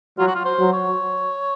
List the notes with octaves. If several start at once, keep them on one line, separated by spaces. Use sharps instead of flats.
F#3 F4
F#4
F4
C5
F#3
C#5